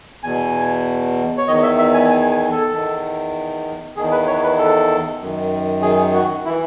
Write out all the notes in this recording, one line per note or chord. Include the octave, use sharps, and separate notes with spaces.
E2 B2 G#5
C#5
E2 D#3 D#5
E5
E5
G#5
G#5
G#5
A4
E2 D#3
E2 D#3 G#4
B4
C#5
B4
A4
F#2 D#3
G#4
F#4
E4
E3